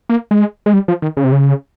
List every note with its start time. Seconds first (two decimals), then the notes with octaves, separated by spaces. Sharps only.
0.09 A#3
0.31 G#3
0.66 G#3
0.73 G3
0.88 F3
1.02 D#3
1.17 C#3
1.24 C3
1.32 C#3